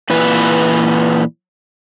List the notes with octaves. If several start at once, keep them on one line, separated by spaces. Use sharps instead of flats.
A#2 E3 B4